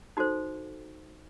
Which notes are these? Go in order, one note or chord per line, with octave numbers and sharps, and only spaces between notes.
D#4 F#4 A4 C5